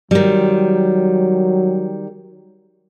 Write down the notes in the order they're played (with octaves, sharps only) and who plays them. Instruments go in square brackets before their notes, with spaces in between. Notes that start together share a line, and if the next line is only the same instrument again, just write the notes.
[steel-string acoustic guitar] D#3 G3 [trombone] F#3